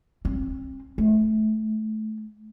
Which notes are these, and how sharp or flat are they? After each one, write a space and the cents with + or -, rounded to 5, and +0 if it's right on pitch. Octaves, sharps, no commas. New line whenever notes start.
C4 +30
A3 -20